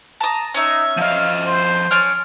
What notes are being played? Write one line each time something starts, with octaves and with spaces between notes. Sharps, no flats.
A5 A#5 D#6
C#4 D#4 E5
F3 D#5 F5
C5
C#4 D5 F6